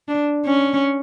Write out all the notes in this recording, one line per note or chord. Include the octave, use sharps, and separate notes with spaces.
D4
C#4